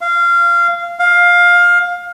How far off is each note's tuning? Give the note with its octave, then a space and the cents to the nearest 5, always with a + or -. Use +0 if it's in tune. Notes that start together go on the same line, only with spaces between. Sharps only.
F5 -20
F5 +15